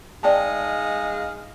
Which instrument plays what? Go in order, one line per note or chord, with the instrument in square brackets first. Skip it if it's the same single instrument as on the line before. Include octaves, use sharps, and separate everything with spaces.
[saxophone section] G#3 D#4 F5 [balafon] D5 G5 A5